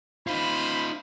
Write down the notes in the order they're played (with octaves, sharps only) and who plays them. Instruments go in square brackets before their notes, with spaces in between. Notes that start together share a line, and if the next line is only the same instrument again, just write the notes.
[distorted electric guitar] D#4 F4 [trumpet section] C5 F5 B5